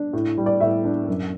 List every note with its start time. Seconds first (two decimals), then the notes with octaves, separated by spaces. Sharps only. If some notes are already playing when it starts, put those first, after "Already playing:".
Already playing: D4
0.13 A2
0.38 G3
0.46 D5
0.60 A2 E5
0.85 D4
1.08 F#2